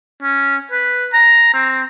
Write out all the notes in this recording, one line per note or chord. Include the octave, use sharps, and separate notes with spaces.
C#4
B4
A#5
C4